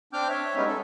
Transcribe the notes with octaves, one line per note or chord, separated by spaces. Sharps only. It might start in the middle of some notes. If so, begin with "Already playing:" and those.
C4 D4 G5 D6 F6 G6
C#5 E5
G3 G#3 B3 C#4 D#4
A4